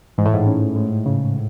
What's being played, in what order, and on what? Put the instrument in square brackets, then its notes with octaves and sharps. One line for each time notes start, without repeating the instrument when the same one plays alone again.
[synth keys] G#2 [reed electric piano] E3
[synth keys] A2
G#2
[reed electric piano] C#4
G#3
C#3